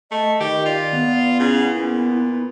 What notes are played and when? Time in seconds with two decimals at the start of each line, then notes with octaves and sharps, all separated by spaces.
0.12 A3 D#5
0.40 D#3 G4
0.65 F4 D5
0.93 B3
1.40 C#3 E4
1.75 A#2